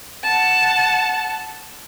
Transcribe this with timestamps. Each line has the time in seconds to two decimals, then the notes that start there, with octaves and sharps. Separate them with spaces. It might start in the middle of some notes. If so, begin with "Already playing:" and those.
0.24 F#5 A5